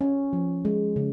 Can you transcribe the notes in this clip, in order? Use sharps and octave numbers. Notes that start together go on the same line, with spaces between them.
C#4
F3
G#3
C#3